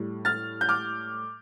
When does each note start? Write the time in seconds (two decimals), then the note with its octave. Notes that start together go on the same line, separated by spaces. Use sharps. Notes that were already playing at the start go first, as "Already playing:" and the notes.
Already playing: A2 G3
0.25 F6 A6
0.61 G6
0.69 D6 F6